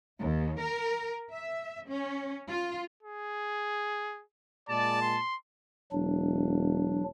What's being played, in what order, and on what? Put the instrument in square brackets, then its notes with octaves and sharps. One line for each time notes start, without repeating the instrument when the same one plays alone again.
[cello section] D#2
A#4
E5
C#4
F4
[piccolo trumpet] G#4
[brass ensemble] A#2 G#3 A5 [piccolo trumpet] D5
[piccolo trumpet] C6
[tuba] E1 [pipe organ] F#3 D4